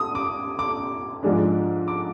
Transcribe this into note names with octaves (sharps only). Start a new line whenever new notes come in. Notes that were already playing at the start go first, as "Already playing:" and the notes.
Already playing: D#6
D6
D6
G#2 F3 G#3 D4
D6